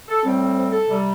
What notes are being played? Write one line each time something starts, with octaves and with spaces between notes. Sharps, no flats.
A4
A2 G3 C4
C5
A4
C3 G3